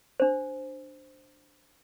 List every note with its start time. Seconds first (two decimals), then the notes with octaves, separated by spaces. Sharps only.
0.20 D4 C5